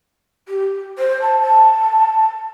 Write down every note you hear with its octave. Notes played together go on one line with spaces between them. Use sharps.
G4
C5
A5
A5